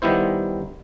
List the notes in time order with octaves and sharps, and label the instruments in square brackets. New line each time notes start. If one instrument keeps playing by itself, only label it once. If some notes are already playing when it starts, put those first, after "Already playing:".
[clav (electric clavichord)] D#3 G3 B3 E4 C5